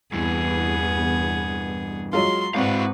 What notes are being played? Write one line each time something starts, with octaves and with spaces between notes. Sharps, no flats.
E2 G2 E3 B3 G#4
F#3 G#3 F4 C6
G#1 G#2 C4 E4 F#4 B4 F5